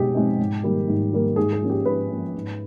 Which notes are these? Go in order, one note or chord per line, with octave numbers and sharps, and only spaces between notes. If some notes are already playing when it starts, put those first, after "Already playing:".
Already playing: B2 G#3 C4 D#4 G4 G#4
G#3 C4 D#4
G#2
D#3 G3 A#3
G#2
D#3 G3 A#3
G#2 G#4
G#4
F3 A#3 C#4
G4
G#2 B4
F3 A#3 C#4
G#2